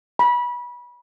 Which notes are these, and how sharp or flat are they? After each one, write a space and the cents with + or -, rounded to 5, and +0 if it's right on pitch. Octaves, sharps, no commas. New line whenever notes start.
B5 -25